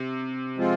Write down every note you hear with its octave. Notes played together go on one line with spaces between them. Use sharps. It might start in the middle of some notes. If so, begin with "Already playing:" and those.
Already playing: C3
F3 G#3 C4 F4